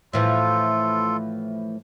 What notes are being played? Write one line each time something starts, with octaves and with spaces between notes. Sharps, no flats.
A2 E3 F3 F4 A4